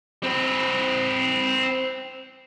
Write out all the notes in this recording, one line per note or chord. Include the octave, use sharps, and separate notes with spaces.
C4 B4